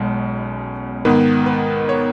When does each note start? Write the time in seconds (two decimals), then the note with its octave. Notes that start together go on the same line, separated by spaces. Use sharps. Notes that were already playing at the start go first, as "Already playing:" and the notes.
Already playing: B1 B2 G#3 C#4
1.05 G#2 D#3 B3 B4
1.46 B4
1.89 C#5